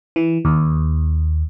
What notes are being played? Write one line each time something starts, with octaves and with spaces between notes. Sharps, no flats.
E3
D#2